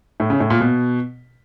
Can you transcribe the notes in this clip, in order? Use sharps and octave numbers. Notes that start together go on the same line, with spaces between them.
A2
C#3
A2
A#2
B2